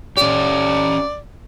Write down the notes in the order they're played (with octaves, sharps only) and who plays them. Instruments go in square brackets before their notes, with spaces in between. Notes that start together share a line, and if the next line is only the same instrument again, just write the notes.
[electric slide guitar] C#4 G4 [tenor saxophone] D5